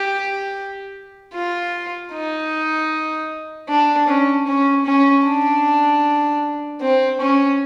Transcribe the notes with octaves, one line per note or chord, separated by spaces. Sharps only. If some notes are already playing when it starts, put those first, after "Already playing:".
Already playing: G4
F4
D#4
D4
C#4
C#4
C#4
D4
C4
C#4